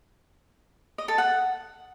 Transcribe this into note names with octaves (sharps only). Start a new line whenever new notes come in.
D#5
A4
F#5